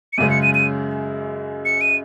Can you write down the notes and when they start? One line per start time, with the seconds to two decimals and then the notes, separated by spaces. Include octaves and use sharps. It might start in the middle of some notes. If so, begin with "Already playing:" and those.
0.13 C#7
0.18 F#2 C#3 G#3 D#7
0.31 C#7
0.43 D#7
0.55 D#7
1.65 C#7
1.81 D#7